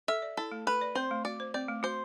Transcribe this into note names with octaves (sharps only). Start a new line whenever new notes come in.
A4 E5
D5
E4 A4
A3
A4 B4
D5
C4 C5
A3
F#4 D5
C5
C4 D5
A3
F#4 C5